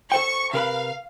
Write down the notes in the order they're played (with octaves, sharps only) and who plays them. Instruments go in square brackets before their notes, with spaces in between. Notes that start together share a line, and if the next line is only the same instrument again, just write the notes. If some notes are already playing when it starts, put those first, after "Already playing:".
[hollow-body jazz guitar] A4 C5 G5 [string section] C#6
[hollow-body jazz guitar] C3 A#4 B4 [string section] F5